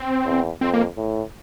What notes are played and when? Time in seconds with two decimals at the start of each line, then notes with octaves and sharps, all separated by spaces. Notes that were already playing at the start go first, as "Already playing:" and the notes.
Already playing: C4
0.25 E2
0.61 F2 C4
0.74 A#3
0.97 A2